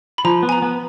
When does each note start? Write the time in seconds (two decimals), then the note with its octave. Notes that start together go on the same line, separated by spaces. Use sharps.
0.18 B5
0.25 F3 A#5
0.43 B3
0.49 G#5
0.52 A#5
0.62 B3